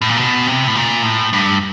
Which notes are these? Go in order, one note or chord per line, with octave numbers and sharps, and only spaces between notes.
A2
A#2
B2
C3
A2
A#2
A2
G2